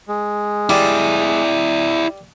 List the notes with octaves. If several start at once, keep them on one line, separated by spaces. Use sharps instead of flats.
G#3
G3 E4 D5